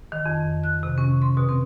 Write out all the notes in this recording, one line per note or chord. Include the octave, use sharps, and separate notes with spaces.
D#3
F2
F#6
C3
C#4
C6
B2
C4